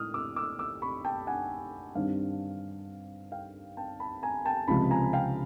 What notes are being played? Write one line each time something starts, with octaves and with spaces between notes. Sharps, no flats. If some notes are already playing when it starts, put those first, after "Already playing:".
Already playing: A2 G#3 D#6 F6
D6 E6
D6 E6
D6 E6
B5 C#6
G5 A5
F#5 G#5
G2 D#3 G3 C4 F5
F5 G5
G5 A5
A5 B5
G#5 A#5
G5 A5
C#2 C3 F3 G#3 A5 B5
G#5 A#5
F5 G5